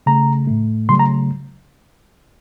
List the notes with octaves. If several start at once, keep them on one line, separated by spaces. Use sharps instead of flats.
C#3 A3 A#5
A2 A3
C#3 F#3 A3 C6
A#5